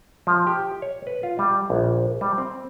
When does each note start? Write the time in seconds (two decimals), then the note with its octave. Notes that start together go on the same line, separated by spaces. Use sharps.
0.27 F3
0.47 G4
0.82 C#5
1.07 B4
1.23 F4
1.39 G3
1.70 A#1
2.21 G3
2.38 C4